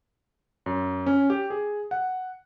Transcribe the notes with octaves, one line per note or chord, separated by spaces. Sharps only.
F#2
C#4
G4
G#4
F#5